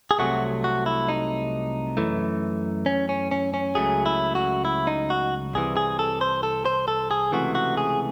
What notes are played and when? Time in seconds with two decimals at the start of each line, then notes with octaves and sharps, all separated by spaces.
0.11 G#4
0.19 C2 C3 F#3 A3 F#4
0.64 F#4
0.86 E4
1.08 D#4
1.97 F#2 E3 A3
2.86 C#4
3.09 C#4
3.31 C#4
3.54 C#4
3.75 C#2 C#3 F#3 A3 G#4
4.06 E4
4.35 F#4
4.65 E4
4.87 D#4
5.10 F#4
5.54 C2 C3 E3 G#4
5.77 G#4
5.99 A4
6.21 C5
6.43 A4
6.65 C5
6.88 A4
7.11 G#4
7.32 C#2 C3 E3 A3 F#4
7.55 F#4
7.77 G#4